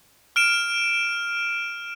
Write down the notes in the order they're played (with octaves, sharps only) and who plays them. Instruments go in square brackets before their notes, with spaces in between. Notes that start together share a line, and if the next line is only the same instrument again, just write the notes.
[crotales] F6 D7 E7